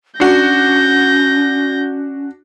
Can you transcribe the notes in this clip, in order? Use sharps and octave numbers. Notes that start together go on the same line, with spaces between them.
C#4 D4 F#4 G6 A#6